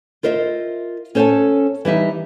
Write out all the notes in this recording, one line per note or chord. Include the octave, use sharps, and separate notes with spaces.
F4 A#4 C5 D#5 E5
C#4 A4 C5 C#5 G#5 A5
E3 G3 D#4 E5